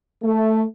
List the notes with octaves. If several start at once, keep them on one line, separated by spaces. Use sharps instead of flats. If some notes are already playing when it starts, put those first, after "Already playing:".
A3